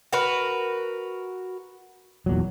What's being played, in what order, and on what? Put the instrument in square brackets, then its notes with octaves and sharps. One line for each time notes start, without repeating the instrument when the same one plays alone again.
[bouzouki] F#4 A#4 B4
[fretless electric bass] E2 A#2 F#3